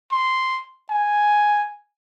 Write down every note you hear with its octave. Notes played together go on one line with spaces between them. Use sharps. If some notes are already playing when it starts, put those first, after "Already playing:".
C6
G#5